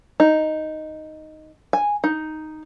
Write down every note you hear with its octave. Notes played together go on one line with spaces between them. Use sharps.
D#4
G#5
D#4